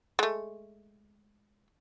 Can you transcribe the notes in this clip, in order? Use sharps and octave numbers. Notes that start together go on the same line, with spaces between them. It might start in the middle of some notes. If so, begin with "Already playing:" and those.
G#3 A3